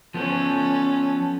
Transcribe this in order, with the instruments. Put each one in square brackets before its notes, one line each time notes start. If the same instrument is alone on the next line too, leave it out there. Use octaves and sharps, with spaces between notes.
[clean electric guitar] F3 B3 [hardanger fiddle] C#4 A4